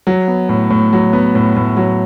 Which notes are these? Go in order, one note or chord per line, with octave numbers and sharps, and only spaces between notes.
F#3
B3
A2
A2
F#3
B3
A2
A2
F#3